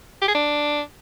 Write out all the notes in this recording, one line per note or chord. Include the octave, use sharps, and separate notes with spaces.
G4
G#4
D4